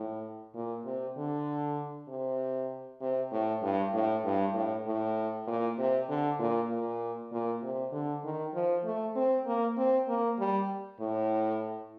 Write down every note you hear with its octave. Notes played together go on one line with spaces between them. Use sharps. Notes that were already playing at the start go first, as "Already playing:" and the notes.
Already playing: A2
A#2
C3
D3
C3
C3
A2
G2
A2
G2
A2
A2
A#2
C3
D3
A#2
A#2
A#2
C3
D3
D#3
F3
A3
C4
A#3
C4
A#3
G3
A2